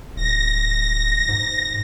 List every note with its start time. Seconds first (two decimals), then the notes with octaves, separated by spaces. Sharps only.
0.16 D1 A#6
1.29 G#2